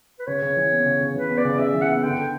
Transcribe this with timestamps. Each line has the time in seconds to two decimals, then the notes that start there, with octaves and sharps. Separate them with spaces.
0.19 B4
0.27 C#3 C#5
0.42 C#3
0.57 E3
0.71 B3
0.86 C#3
1.01 C#3
1.14 E3 B4
1.30 B3
1.38 D5
1.45 C#3
1.59 C#3 E5
1.74 E3
1.81 F#5
1.89 B3
2.03 D3 G5
2.18 D3